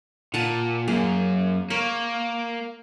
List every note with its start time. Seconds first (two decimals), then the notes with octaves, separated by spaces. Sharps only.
0.34 A#2 F#5 A5 A#5
0.88 F#2 A#3 G#4
1.70 A#3 A#4 C#5